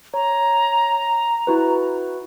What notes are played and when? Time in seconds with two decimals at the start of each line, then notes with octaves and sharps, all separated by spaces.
0.14 C#5 A#5
1.47 E4 F#4 B4